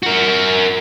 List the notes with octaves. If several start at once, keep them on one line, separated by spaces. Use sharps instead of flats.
F#4 A#4